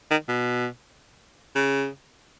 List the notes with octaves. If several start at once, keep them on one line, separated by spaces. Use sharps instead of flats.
D#3
B2
C#3